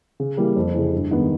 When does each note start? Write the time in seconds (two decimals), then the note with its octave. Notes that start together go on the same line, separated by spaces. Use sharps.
0.20 C#3
0.37 E3 G3 A#3
0.56 F2
0.74 C#3 E3
0.93 G2
1.11 D#3 G#3 B3